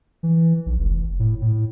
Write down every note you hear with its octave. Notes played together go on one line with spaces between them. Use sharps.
E3
B1
F1
A2
A2